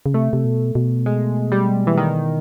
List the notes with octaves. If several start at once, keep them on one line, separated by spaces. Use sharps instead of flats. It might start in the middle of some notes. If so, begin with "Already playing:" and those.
C#3
C3 A3
C3
B2
B2
G#3
G3
E3
D#3